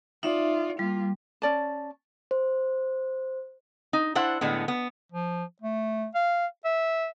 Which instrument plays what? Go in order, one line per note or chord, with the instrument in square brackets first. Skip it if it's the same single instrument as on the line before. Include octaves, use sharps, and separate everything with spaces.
[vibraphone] D#4 E5 [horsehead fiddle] F4 D5
[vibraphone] G3 [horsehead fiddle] A#3 F4
[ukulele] C#4 D5 A5
[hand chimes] C5
[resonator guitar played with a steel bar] D#4
D4 E4 C5 F#5
A2 D3 G#3 B3
B3
[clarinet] F3
A3
F5
E5